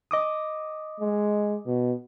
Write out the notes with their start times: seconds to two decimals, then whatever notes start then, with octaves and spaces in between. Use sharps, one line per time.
0.11 D#5 D6 D#6
1.00 G#3
1.66 B2